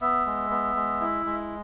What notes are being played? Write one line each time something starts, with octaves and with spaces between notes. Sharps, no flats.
B3 E5
G#3
B3
G#3
E4
G#3